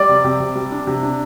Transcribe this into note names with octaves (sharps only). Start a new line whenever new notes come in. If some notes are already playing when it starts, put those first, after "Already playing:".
Already playing: G3 D5
C3
C3
C3
G3
D4
C3
D4